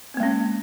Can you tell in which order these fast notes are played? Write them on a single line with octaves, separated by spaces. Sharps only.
C4 A#3 G#3 C#4